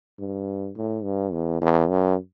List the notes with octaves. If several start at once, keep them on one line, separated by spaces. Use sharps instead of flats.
G2
A2
G2
E2
E2
F#2